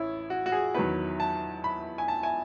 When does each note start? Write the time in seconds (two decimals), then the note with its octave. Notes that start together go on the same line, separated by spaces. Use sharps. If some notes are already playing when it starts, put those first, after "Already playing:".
Already playing: A1 E4 C#5
0.30 F#4
0.46 F#4
0.52 G#4
0.74 E2 D#3 F#3 B4
1.20 A5
1.64 B5
1.98 G#5
2.08 A5
2.23 G#5